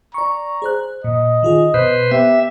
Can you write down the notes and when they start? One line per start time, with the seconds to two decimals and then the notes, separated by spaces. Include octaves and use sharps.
0.14 D5 A#5 C#6
0.62 G#4 C5 F#6
1.04 A#2 D#5
1.43 D#3 F4 G#4
1.74 B2 B4 C5
2.11 B3 G4 E5